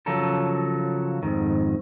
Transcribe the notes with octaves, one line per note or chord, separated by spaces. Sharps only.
C#3 F3 F#3 A4 A#4
F2 G#2 D#3